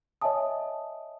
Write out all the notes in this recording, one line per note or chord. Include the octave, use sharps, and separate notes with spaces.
C#5 D#5 E5 G#5 A5 D#6